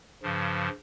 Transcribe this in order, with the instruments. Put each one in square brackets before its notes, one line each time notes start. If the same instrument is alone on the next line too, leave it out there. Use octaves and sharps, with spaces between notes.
[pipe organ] G2 C#3 F3